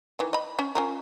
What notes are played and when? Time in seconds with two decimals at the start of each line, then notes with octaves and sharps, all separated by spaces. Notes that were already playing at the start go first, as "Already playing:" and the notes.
0.19 D#3 E3
0.33 D#5 B5
0.59 C#4
0.75 C#4 F4 A#4